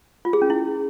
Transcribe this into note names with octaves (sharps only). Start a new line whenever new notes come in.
F4
G#4
C#4
E4